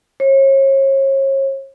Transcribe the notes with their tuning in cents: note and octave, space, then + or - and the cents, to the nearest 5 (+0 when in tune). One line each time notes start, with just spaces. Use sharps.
C#5 -35